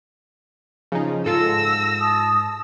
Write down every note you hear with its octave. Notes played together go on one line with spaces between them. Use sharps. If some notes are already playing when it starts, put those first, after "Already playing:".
C#3 F3 D#4
G#2 F4 A4 E6 A#6
A5 D#6